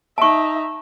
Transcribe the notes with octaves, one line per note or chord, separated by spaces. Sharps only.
D#4 E5 A5 C#6